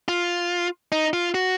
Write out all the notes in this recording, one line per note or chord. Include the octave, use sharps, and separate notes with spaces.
F4
D#4
F4
F#4